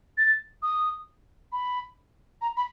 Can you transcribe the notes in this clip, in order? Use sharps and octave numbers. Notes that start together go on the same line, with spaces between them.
A6
D#6
B5
A#5
B5